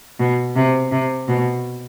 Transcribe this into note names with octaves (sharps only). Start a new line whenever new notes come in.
B2
C3
C3
B2